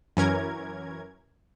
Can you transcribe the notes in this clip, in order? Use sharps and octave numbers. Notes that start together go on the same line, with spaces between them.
F#2 E3 C#4 A#4 G#6